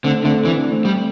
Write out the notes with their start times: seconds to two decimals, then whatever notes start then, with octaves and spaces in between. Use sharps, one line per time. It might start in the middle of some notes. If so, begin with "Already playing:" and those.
0.04 D3 A3 C4
0.25 D3 A3 C4
0.45 E3 C4
0.59 D4
0.71 A3 C4
0.85 G3